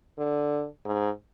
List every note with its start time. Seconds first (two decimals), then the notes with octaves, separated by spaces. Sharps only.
0.18 D3
0.85 G#2